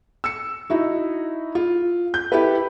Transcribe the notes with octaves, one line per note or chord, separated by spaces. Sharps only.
E6 C#7
D#4 E4 F#4
F4
G6
E4 G4 A4 B4